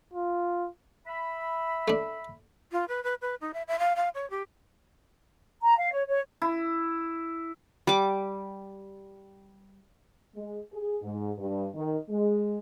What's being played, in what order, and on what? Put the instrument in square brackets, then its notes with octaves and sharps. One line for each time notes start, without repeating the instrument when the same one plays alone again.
[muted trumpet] F4
[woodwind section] E5 B5
[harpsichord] A3 D4
[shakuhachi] F4
B4
B4
B4
D#4
E5
E5
F5
F5
C#5
G4
[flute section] A#5
F5
C#5
C#5
[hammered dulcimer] E4
[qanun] G3 D6
[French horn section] G#3
G#4
G#2
G2
D#3
G#3